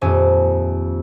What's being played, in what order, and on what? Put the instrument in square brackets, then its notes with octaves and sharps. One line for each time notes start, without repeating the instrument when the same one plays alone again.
[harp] D#1 F2 G#5